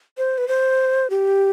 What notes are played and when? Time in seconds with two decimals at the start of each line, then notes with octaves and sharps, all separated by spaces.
0.18 C5
0.38 B4
0.48 C5
1.10 G4